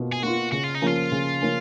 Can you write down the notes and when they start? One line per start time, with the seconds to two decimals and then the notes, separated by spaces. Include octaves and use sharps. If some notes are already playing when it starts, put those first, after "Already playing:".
Already playing: B2 A#3 F4
0.12 G#4
0.22 A#3 F4 F#4
0.52 C#3 F#4
0.64 F4
0.75 D#4
0.82 F3 A#3 C#4 F4
1.12 C#3
1.41 F3 A#3 C#4